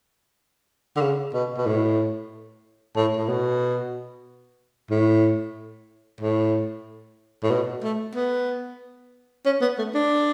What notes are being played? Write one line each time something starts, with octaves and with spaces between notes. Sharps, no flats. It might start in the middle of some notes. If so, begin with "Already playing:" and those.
D3
C#3
B2
B2
A2
A2
A2
B2
A2
A2
A2
B2
A3
B3
C#4
B3
A3
D4